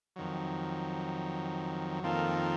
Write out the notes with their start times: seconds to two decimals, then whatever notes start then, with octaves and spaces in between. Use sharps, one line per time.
0.16 F2 D#3 F#3
2.04 F2 D#3 A#3 F4 A4